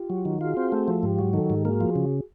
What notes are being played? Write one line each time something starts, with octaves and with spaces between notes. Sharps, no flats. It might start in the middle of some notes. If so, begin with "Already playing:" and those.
Already playing: F4 G4
F#3
D#3
F4 F#4 G#4
C4
A3
F3
G#2 F4 G4
F#3
D#3 G4 A4
G#2
A#3 F#4 G#4
F3
C#3